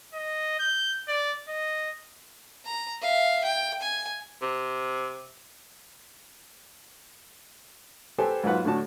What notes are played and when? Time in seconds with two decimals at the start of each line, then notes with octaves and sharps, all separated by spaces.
0.13 D#5
0.59 G6
1.08 D5
1.49 D#5
2.65 A#5
3.02 E5 F5
3.44 G5
3.82 G#5
4.41 C3
8.18 G4 A4 B4 C5 G#5
8.44 G#2 F#3 A#3 F4 B4 F#5
8.65 A2 D3 D4 F#4 A5